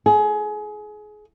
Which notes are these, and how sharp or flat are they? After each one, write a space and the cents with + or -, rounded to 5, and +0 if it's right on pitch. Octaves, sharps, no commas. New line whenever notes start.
G#4 +25